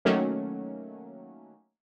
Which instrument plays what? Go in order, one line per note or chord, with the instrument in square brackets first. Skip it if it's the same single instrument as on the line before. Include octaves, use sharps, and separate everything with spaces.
[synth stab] D#3 F#3 A3 A#3 C#4